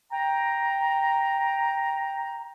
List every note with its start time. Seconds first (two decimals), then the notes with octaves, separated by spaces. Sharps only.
0.12 G5 A#5